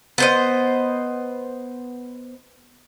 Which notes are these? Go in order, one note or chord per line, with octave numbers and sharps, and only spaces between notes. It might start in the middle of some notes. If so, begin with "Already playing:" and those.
B3 C5 D#5